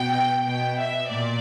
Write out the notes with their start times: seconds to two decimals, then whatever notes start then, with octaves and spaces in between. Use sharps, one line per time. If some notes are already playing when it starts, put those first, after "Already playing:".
Already playing: B2 G5
0.46 B2 G5
0.78 E5
1.10 A#2 D5